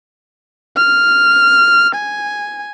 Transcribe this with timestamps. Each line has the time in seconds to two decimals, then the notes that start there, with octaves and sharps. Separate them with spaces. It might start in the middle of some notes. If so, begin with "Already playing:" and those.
0.77 F6
1.95 G#5